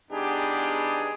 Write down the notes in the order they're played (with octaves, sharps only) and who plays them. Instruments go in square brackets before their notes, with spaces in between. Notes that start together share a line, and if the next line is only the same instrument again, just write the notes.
[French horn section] E2 B3 G4 [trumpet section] D4 D#4 G#4